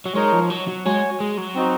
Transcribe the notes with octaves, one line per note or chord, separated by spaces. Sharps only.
F#3
G#3 D#4 A#4 C#5
F3
F#3
F#3
G#3 F#4 C#5 G#5
G#3
F#3
C4 D#4 F#4